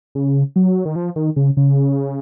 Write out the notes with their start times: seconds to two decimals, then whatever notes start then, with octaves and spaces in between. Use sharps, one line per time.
0.15 C#3
0.56 F#3
0.85 D#3
0.96 F3
1.16 D#3
1.36 C#3
1.57 C#3